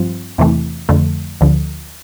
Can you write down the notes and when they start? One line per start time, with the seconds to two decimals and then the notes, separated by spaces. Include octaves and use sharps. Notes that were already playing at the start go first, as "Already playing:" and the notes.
Already playing: G2 F3 C4 F4
0.38 E2 C3 E3 A3
0.89 F2 D3 A3
1.41 D2 D3 F3